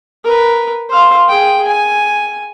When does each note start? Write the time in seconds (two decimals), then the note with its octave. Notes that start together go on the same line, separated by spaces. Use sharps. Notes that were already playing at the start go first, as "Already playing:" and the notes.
0.24 A#4 B4
0.90 C5 F5
1.29 G#4 G5
1.67 G#5